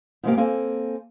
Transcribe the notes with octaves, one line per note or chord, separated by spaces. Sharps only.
G#2 C3 F3 A3 A#3 G4
A#3 C4 A4 G#5